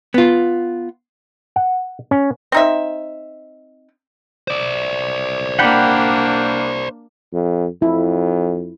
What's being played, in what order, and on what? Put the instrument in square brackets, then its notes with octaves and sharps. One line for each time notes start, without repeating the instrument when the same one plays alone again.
[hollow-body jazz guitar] B3 F4
[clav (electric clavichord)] F#5
C#4
[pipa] C4 D#4 E5
[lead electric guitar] C5 D5
[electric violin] A#3 D4 [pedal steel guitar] F#5 G5 B5
[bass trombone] F2
[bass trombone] F2 [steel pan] E4